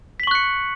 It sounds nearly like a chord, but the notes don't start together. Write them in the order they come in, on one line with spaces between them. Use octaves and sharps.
B6 F#7 C#6 F#6 C#7